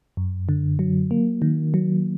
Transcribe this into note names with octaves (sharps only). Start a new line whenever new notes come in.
F#2
D3
F#3
A#3
D#3
F#3